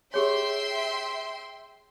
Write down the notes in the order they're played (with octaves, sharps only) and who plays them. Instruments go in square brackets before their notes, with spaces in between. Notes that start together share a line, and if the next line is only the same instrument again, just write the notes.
[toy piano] G4 G#4 C#5 [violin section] E5 G5 C6